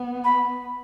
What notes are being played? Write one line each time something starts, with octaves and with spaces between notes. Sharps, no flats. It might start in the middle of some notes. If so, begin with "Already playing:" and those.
Already playing: B3
B5